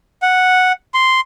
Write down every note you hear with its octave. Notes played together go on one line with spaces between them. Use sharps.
F#5
C6